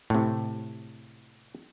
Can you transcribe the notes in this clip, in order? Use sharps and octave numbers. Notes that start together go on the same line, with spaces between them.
A2 C3